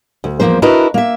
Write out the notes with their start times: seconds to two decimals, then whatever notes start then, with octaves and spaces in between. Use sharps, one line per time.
0.24 D2
0.40 E2 A#2 F3 A#3 C5
0.62 D4 E4 F#4 A#4 B4 D#5
0.94 A#3 E5